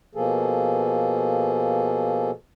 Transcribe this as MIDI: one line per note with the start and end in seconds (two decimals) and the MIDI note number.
0.15 2.31 47
0.15 2.31 53
0.15 2.31 58
0.15 2.31 68
0.15 2.31 69